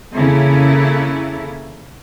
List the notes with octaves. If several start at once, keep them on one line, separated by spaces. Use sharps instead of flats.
C#3 E3 A#3 C#4 E4 A4